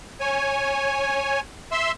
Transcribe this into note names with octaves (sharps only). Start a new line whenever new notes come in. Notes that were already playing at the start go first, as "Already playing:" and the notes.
C#5 G#5
E5 C6 E6